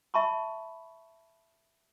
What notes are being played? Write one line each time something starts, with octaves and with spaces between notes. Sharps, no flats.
E5 A5 B5 C#6